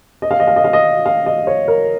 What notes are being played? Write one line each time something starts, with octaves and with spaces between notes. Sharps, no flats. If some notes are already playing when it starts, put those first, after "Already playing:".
D#5
F5
D#5
F5
D#5
F5
D#5
F5
D#5
C#5
A#4